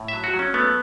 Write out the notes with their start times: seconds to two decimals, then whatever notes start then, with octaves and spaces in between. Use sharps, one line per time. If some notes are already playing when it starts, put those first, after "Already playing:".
Already playing: A2
0.08 F#3 E5
0.24 F#4
0.34 F#3
0.39 C#4
0.54 A3 B3